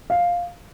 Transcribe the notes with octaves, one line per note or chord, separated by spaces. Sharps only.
F5